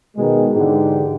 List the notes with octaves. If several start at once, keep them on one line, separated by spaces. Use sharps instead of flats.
B2 D#3 G#3
G#2 D3 E3 D#4 G4